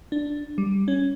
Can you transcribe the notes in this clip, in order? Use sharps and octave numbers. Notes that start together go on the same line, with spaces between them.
D4
G3
C#4